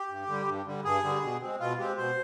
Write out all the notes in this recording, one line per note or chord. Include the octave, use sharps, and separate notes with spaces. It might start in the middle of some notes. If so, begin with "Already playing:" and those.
Already playing: G4
G2
D3 G3
G2
D3 G3
G2 G#4
D3 G3
B2
G#3 C4
B2 F4
G#3 C4 G4
B2 C5